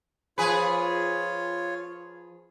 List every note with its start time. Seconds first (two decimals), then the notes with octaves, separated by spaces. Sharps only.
0.38 F3 F4 G#4 B4 C#5